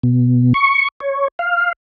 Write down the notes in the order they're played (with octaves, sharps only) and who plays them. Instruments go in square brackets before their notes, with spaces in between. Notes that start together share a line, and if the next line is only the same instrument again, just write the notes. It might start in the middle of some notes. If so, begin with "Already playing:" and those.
[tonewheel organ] B2
C#6
C#5
F5